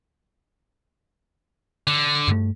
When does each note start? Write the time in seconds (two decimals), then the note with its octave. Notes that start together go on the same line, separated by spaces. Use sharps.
1.87 D3
2.28 G2 A3